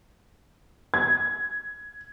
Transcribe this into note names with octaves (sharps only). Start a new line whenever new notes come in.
G#6